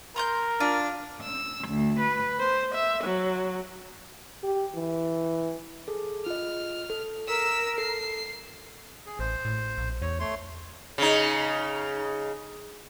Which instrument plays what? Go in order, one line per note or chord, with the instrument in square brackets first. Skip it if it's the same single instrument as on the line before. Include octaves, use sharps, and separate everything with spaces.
[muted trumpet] A#4 [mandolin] A#5 C6 G6
[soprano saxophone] D4 [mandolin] F4
[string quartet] E6
D2
B4
C5
E5
F#3
[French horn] G4
E3
[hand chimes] G#4 A4
[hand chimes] F4 D#5 [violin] F6
[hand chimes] A4
[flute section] A#4 [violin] E6 B6
[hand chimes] A4 [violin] C7
[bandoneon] G#4
[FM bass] A1 [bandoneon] C5
[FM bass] A2
A#1
[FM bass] E2 [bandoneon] C#5
[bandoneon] A3 C#5 C6
[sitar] C#3 D#4